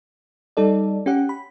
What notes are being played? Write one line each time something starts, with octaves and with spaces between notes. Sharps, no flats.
G3 D#4 A4 D5
C#4 G4 F#5
B5